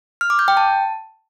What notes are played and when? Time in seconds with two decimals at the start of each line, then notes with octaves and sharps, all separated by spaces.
0.21 F6
0.30 D6
0.39 G6
0.48 G5
0.57 A5